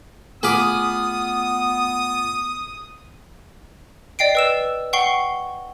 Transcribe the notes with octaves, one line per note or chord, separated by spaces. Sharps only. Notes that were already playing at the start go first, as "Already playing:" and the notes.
A3 B3 F4 G#4 B5 D6 D#6 F6
D5 D#5 G5 C7 D7
B4 E6 E7
F#5 G5 C#6 C7 G7